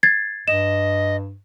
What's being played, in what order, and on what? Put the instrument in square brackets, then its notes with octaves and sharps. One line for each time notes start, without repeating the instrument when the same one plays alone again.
[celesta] G#6 A6 C7
[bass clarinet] G2 [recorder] D#5 [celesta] E7